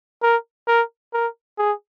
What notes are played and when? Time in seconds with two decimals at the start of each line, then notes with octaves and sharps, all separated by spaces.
0.23 A#4
0.68 A#4
1.13 A#4
1.58 G#4